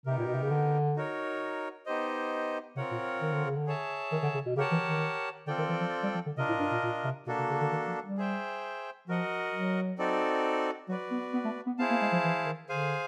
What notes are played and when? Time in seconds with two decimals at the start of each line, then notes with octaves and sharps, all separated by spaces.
0.05 C3 B3 D#4 G4 A#4
0.18 A#2
0.27 B2
0.34 C3
0.43 C#3
0.50 D3
0.96 D#4 F#4 A#4 C#5
1.86 B3 D#4 G4 C5 D#5
2.76 C3 C4 F4 A#4 C#5 F#5
2.92 A#2
3.22 D#3
3.33 D3
3.45 C#3
3.56 D3
3.67 G#4 C#5 E5 A5
4.12 D#3
4.23 D3
4.34 C#3
4.46 B2
4.56 C#3 G4 A#4 C#5 F#5 A5
4.72 E3
4.87 D#3
5.47 D3 C4 F4 A4 D5 G5
5.58 D#3
5.69 E3
5.81 F3
6.03 G3
6.15 F3
6.26 D3
6.37 C3 D4 F4 A#4 D#5
6.49 A2
6.60 G2
6.72 A#2
6.83 A#2
7.04 C3
7.27 B2 A#3 D4 F#4 A4
7.39 C3
7.50 C#3
7.61 D3
7.72 D#3
7.88 F3
8.03 G3
8.18 G#4 C5 E5 G5
9.08 F3 F#4 A#4 D#5 F#5
9.53 F#3
9.98 C4 D#4 F#4 A4 D5
10.89 F#3 F#4 B4 D5
11.11 B3
11.34 B3
11.45 A3
11.67 B3
11.78 B3 E4 G#4 C5 F5 A5
11.91 A#3
12.02 G#3
12.12 F3
12.24 E3
12.46 D#3
12.69 D3 G#4 C5 F5 G#5